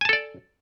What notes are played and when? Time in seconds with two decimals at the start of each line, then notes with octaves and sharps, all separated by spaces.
0.01 G#5
0.05 A5
0.09 A4
0.13 D5